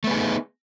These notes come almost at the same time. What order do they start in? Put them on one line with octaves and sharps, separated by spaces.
A3 B3 G#4 D#4